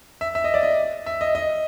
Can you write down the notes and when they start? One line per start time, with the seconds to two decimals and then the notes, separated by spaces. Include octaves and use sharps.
0.21 E5
0.35 E5
0.44 D#5
0.54 D5
0.63 D#5
1.06 E5
1.21 D#5
1.35 D#5